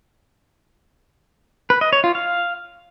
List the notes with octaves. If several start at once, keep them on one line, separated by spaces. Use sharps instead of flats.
B4
D#5
C#5
F4
F5